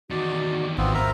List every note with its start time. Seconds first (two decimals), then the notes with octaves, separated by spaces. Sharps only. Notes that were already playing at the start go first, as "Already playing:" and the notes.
0.10 E2 D#3 F#4 D5
0.78 G#1 B3 C4 F4
0.94 A#4 C5 E5 A#5